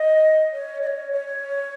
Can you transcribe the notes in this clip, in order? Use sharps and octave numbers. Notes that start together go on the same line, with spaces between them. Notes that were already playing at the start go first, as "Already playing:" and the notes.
Already playing: D#5
C#5
D#5
C#5
C#5